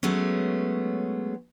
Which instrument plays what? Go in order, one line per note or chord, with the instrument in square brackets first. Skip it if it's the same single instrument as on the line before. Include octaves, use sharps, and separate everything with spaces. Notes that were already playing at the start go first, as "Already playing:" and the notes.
[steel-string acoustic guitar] F#3 G#3 A3 B3 C#4